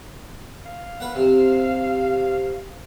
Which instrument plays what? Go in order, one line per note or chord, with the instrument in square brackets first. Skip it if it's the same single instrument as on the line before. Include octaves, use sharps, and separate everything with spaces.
[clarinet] F5
[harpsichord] B4 F#5
C3